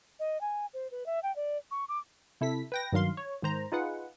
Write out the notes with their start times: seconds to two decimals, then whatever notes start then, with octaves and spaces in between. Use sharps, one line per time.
0.20 D#5
0.41 G#5
0.74 C5
0.91 B4
1.06 E5
1.23 G5
1.36 D5
1.71 C#6
1.89 D6
2.41 C3 E4 A4 B6
2.72 B4 G5 A#6
2.92 G2 D#3 F#3 F5 C6
3.17 C#5
3.42 G#2 D#3 C5 A#5
3.72 D#4 F4 G#4 B4 F#5